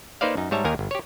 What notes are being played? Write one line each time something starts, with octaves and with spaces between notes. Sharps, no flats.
A#3 D#4 B4 C5 D5 F5
F#2 D#4
G#2 G3 C#5 E5 A5 A#5
D#2 D#3 A#4 G#5 A#5
G1
G4 C#5